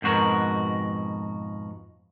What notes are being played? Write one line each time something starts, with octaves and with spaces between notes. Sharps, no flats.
F2 G#2 B2 F#4 A#4